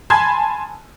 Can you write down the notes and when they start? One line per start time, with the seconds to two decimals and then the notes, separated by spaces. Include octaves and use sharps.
0.10 G#5 A5 B5 C6 G#6